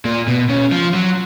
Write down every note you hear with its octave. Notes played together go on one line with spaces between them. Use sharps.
A#2
B2
C#3
F3
F#3